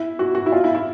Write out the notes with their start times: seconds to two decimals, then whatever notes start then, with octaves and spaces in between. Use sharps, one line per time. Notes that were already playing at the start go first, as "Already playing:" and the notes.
Already playing: E4
0.19 F#4
0.35 F#4
0.46 E4
0.52 F4
0.64 E4
0.75 E4